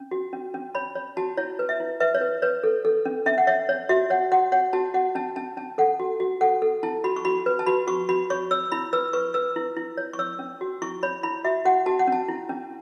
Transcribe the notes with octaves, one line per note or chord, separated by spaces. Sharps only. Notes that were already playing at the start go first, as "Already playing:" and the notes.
Already playing: C#4
F#4
C#4
C#4
C#5 B5
C#5
F#4 A5
E4 C#5
B4
E5
E4
B4 E5
C#5
B4
B4 C#5
A4
A4
C#4
C#4 E5
F#5
C#5 E5
C#5
F#4 E5
C#5 F#5
F#4 F#5
C#5 F#5
F#4 A5
F#4 F#5
C#4 A5
C#4 A5
C#4 A5
A4 F#5
F#4
F#4
A4 F#5
A4
E4 A5
F#4 B5
C#6
F#4 B5
B4
A5
F#4 B5
F#4 C#6
F#4 B5
C#5 C#6
C#5 E6
E4 B5
B4 E6
B4 C#6
B4 E6
E4
E4
C#5
C#6
C#5 E6
C#4
F#4
E4 C#6
C#5 B5
E4 B5
F#4 E5
F#4 F#5
F#4 A5
F#5
C#4
A5
E4
C#4